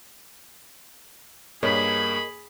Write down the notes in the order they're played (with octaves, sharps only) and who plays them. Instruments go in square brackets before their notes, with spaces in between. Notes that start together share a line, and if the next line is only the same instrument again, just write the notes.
[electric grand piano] G2 A#3 B6 [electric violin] G#4 B5 [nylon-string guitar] A#4 C#5 D#5